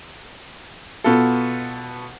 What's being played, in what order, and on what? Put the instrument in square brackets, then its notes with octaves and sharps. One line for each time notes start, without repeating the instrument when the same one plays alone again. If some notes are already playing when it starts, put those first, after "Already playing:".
[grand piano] B2 B3 F4 A4